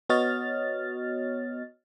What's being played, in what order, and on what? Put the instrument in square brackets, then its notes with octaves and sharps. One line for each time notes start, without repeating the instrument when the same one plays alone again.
[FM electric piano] B3 F#4 C#5 D#5 F6 A6